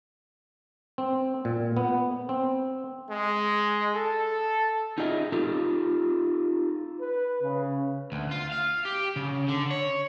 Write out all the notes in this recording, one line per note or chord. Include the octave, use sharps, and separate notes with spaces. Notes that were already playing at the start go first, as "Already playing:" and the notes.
C4
A#2
B3
C4
G#3
A4
D#4 F4 G#4 D#5 E5
D#4 F4 G4 A4
B4
C#3
D2
F4
F5
G4
C#3
D3
C#5